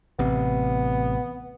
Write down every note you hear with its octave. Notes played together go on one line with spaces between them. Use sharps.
A1 C3 B3